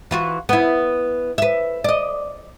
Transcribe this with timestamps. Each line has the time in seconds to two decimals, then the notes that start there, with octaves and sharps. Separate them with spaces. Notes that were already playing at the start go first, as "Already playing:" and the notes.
0.11 E3 F4 F#4
0.49 B3 E4
1.38 B4 E5
1.84 D5 D#5